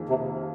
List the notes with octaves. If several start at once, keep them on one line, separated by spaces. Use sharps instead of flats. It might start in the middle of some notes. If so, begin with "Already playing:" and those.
Already playing: F2 D#3 A#3 F4 G#4
C3